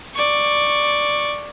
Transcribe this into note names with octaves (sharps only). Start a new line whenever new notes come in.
D5 C#6